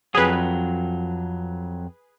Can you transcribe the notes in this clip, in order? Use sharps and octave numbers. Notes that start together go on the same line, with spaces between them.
F2 F#3 G#4 B4